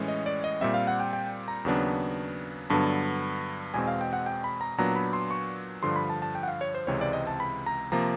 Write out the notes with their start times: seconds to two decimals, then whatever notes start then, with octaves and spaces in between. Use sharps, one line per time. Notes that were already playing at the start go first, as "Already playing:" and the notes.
Already playing: A2 E3 G#3 C#4
0.08 D#5
0.26 D5
0.44 D#5
0.61 A#2 G3 C4 E5
0.74 F5
0.87 F#5
1.00 G5
1.13 G5
1.48 A#5
1.65 D#2 C#3 F#3 B3 D4
2.70 G2 D3 F#3 B3 A5
3.74 E2 B2 G#3 C4 G#5
3.88 F5
4.01 G5
4.13 F#5
4.26 G5
4.44 B5
4.61 A#5
4.78 A#2 F#3 B3 D4 A#5
4.96 B5
5.13 C6
5.31 C#6
5.83 G2 D3 F3 C6
5.96 B5
6.10 A5
6.22 A5
6.35 G5
6.43 F#5
6.48 F5
6.61 C#5
6.75 C5
6.87 C#2 C3 E3 G#3 C4 C#5
7.01 D5
7.13 D#5
7.27 A5
7.40 B5
7.66 A#5
7.92 C3 F3 A#3 A#5